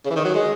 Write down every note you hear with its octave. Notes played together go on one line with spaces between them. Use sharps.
C#3
E3
D#3
F#3
G#3